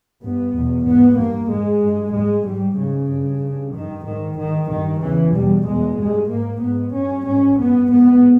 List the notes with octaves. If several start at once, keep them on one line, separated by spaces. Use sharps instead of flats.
G2 B3
E2 B2
G#2 B3
G2 A#3
G#2 G#3
G2
G#2 G#3
G#2 G3
G#2 C#3
G2
G2
G2 D#3
G#2 D#3
G#2 D#3
G2 D#3
E2 C#3 E3
E2 B2 G3
E2 B2 G#3
G2 G#3
G#2 A#3
G#2 B3
G2 C#4
G#2 C#4
G2 B3
G#2 B3